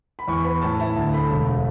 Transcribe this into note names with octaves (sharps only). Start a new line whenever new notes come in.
B5
E2 C#6
B3 B5
A2 A5
E4 A5
D2 A5
A3 B5
E1